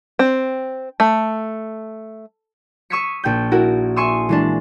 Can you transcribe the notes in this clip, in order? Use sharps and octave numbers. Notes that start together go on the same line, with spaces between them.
C4
A3
C#6 D#6 E6 G#6 B6 C#7
A#1 G5 G6
E4 F#4 A#4
E5 G#5 C6 C#6 D#6 E6
E3 G#3 D4